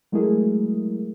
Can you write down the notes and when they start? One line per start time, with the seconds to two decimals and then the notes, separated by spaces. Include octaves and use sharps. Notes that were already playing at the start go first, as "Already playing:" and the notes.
0.12 F#3 G#3 A3 E4 G#4 A#4